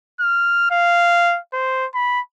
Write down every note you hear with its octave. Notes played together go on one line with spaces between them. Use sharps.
F6
F5
C5
B5